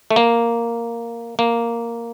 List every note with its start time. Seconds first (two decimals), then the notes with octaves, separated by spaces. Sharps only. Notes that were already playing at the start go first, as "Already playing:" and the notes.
0.11 A3
0.16 A#3
1.39 A#3